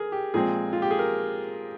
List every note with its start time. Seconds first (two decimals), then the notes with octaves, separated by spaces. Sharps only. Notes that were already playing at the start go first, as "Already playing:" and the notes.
Already playing: G#4 A#4
0.12 G4
0.34 A#2 F3 G#3 C4 G#4
0.73 F4
0.82 G4
0.91 G#4
0.99 A#4